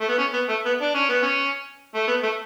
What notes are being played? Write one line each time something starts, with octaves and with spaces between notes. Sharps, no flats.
A3
B3
C#4
B3
A3
B3
D4
C#4
B3
C#4
A3
B3
A3